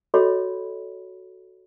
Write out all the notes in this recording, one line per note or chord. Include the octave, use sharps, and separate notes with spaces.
F#4 A4 C#5 D#5 B5